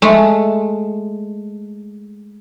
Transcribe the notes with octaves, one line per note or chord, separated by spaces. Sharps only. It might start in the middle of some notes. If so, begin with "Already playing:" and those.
G#3 A3